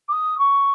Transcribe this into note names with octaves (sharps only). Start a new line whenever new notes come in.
D6
D#6
C#6